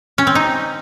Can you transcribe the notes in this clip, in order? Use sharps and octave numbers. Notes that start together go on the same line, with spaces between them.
C#4
C4
D#4